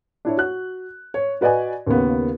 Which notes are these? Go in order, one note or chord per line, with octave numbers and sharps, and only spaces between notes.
D4 E4 C#5
F#4 F#6
C#5
F#4 B4 D5 D#5 G#5
D#2 C#3 A#3 B3